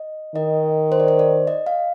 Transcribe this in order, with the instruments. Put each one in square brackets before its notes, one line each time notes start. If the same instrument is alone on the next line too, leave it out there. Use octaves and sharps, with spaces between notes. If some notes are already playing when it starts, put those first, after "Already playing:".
Already playing: [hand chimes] D#5
[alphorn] D#3 [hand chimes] D#5
[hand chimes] C5
D5
C5
D5
D#5
F5